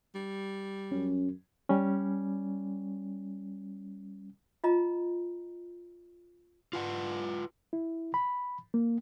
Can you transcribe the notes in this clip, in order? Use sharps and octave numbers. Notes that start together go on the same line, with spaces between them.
G3
F#2 C#4
G3 C#4
F4 D#5 A#5
F4 B4 F#5
E4
B5
A#3